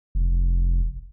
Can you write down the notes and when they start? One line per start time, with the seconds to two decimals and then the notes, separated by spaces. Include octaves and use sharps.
0.15 F1